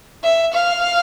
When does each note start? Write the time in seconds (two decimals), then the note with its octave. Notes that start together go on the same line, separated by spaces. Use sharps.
0.24 E5
0.54 F5